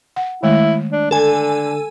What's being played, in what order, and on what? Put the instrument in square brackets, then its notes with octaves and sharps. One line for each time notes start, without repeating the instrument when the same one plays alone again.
[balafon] F#5
[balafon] D#3 G#3 A3 [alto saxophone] E4
[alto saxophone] D4
[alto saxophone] D3 [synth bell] A4 G#5